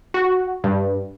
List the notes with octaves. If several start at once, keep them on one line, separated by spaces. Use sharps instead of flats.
F#4
G2